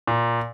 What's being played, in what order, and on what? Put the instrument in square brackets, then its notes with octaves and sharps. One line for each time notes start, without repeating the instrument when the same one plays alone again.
[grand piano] A#2